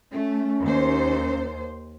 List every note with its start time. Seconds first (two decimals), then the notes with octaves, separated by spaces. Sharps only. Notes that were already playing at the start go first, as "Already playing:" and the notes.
0.12 A3 C#4
0.63 D#2 C5